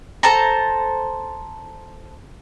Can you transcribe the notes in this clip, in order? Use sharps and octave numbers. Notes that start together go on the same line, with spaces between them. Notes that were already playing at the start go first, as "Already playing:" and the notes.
A4 C5 A5 A#5